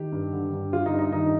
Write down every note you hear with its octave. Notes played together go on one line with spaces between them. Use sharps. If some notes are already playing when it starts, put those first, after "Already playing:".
Already playing: D#3 G4
G2
D3
G2
D3 F4
D#4
G2
D#4
D#3 D#4